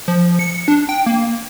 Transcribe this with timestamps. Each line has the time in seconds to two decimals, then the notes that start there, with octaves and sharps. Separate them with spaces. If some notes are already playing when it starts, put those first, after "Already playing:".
0.08 F3
0.39 C#7
0.68 D4
0.89 G5
1.06 A#3